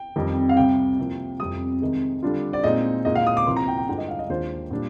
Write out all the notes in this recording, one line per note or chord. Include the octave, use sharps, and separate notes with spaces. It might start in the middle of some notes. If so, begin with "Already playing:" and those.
Already playing: G5
F2 D#3 G3
F5
C2 C3 G3 G5
C2 C3 F3 A#3
F2 C3 G3 D#6
C3 D#3 G#3
D3 G3 D4 F4
D5
A#2 G#3 C4 D#4 D#5
A#2 G#3 D#4 D#5
F5
D#6
D6
C2 C3 F3 A#3 C6
A#5
G5
G5
G2 D3 G#3 D4 F4 G5
D#5
F5
D#5
D#2 D#3 G#3 D4 F4 C5
A#2 G3 D4